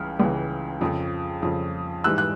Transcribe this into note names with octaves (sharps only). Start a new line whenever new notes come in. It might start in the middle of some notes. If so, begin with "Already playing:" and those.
Already playing: C#2 C#3 E3 F6
C#2 C#3 E3
F2 C#3 F3
F2 C#3 F3
G#2 E3 G3 E6 F#6
F#6